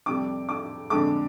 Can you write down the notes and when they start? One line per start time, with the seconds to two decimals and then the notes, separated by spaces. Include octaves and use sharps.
0.06 F2 C3 G3 D6
0.49 D6
0.90 F2 D3 G#3 D6